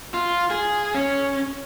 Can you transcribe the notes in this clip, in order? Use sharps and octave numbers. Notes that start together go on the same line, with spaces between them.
F4
G#4
C#4